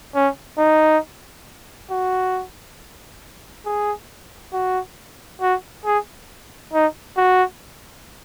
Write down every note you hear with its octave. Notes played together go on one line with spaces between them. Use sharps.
C#4
D#4
F#4
G#4
F#4
F#4
G#4
D#4
F#4